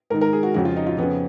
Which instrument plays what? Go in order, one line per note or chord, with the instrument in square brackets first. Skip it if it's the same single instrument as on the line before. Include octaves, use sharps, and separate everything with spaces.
[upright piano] G#2 A#4
D#3
A#4
G#4
F#4
F2 C#3 F#4
F4
D#4
F4
F2 C#3 B3